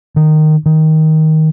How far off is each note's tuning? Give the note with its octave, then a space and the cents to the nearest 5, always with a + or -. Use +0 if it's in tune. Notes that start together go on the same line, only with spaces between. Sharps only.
D#3 -10
D#3 +15